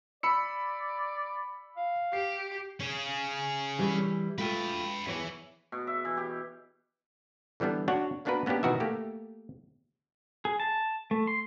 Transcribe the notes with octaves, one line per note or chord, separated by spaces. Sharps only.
D5 B5 E6 C#7
F5
G4 C7
C#4 G#4
E3 G3
A3 F4 B4 G5
E2 E3 C#5
B2
E5
E3
G4
D3 E3 G3 B3 D4
D4 F#4 C#5 F#5
A#3 B3 D4 F#4 A#4 B4
A#3 B3 C#4 D4 G4
B2 D#3 E3 F#4 A#4 E5
A3 A#3 G4
G#4
A5
A3
C6